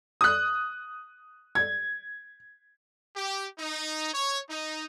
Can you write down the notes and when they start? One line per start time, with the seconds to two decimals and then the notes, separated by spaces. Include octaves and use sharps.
0.21 D#6 F#6
1.55 G#6
3.16 G4
3.59 D#4
4.13 C#5
4.49 D#4